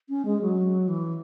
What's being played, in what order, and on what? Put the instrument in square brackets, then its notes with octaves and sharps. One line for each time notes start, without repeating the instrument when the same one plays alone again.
[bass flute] C#4
G#3
F#3
E3